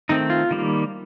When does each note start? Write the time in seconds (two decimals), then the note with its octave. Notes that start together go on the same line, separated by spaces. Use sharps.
0.09 D#3 A3 C4 D#4
0.30 F4
0.51 D#3 G3 A#3